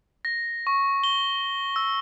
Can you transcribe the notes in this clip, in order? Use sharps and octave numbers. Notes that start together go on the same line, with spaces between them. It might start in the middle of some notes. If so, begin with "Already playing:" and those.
A#6
C#6
G7
E6